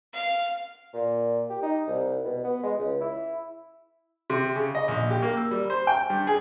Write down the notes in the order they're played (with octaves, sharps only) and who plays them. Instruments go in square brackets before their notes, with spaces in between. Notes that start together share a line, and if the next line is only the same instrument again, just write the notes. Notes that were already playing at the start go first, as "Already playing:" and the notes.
[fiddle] F5
[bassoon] A#2
G4
D#4
C2
B2
B3
G#3
C#2
E4
[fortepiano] C3
C#3
D#5
A#1
G4
A#3
E6
G3
C5
G5
G2
G#4